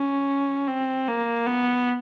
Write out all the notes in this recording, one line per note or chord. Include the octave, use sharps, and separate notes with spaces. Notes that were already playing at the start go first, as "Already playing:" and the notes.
Already playing: C#4
C4
A#3
B3